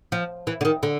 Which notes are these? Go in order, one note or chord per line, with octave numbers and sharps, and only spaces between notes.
F3
E3
D3
D#3
D3